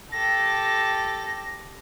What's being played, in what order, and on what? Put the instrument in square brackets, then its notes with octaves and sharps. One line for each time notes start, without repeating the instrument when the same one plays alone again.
[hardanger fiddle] G4 A4 [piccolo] A#6